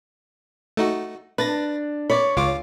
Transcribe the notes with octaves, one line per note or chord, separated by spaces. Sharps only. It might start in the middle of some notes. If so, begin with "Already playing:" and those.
A3 D#4 F#4
D4 B4 A6 A#6
C#5 D5 B5
C#2 F4 D6